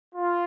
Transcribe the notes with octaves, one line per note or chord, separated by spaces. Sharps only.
F4